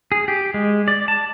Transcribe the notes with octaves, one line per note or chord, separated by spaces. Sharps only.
G#4
G4
G#3
D5
A5